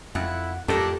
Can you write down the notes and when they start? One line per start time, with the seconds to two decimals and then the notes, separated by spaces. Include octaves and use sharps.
0.15 F2 E4 F#5
0.68 F2 A2 D4 G4 A4 A#4